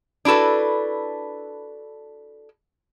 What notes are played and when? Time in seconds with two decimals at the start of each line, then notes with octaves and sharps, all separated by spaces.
0.25 D4 E4 F#4 A4 B4